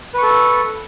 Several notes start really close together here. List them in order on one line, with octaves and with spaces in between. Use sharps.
B4 C#6 A4